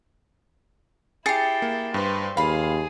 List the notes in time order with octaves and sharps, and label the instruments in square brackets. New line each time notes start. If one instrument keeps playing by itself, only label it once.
[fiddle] E4 G5 [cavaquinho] G4 G#4 [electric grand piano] A6 C7 C#7
[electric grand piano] A#3
[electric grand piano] G2 [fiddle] B4 C5
[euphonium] D#2 [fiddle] G#4 [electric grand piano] F5 [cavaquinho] B5 C6